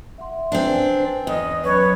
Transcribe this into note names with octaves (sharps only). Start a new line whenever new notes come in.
E5 F#5 C6
C4 D4 B4 G5 G#5
E2 D#5
F#3 C#4 B4 C#5 B5